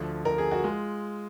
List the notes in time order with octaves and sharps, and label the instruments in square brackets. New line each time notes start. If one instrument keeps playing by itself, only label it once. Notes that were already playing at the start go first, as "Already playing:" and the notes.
Already playing: [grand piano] D2 D3 F3
[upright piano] A#4
G#4
F#4
[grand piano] G#3 F4